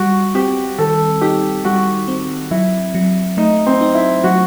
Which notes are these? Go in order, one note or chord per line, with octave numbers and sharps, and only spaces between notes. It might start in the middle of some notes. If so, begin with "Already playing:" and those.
Already playing: G3 F#4
C4 G4
D#3 A4
D#4 G4
G3 F#4
C4
F#3 E4
F#3
A3 D#4
C4
D#4
E4
F#3 F#4